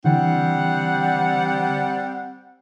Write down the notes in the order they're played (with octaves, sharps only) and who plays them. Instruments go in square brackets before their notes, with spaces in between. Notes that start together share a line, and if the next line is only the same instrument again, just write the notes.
[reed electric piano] D3 E3 [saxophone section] G3 C4 F#5